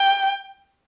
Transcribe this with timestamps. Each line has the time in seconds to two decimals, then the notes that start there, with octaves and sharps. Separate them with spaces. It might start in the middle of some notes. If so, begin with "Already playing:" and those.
Already playing: G5